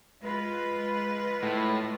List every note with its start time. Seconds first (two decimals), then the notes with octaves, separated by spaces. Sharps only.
0.23 G#3 F4 B4
1.43 A2